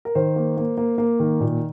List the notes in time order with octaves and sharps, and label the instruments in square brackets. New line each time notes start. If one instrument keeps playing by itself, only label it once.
[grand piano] A#4
D#3 C5
A#3
A#3
A#3
A#3
D#3
A#2